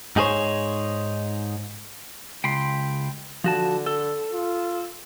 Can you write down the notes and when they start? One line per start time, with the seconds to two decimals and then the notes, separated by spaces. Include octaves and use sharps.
0.16 G#2 D#4 G#4 A4 C5 C#5
2.44 C#2 G5 B5 C6
3.44 D3 F3 F#4 A5
3.86 A4
4.33 F4